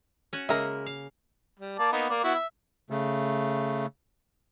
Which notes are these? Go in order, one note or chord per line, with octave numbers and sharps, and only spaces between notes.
C#4 F#4
C#3 G#3 A#3 A#4 E5
F5
G3
A#3 D5 A5
A#3 B3 D#4
A#3 D5
B3 E4 F#4
E5
C#3 A3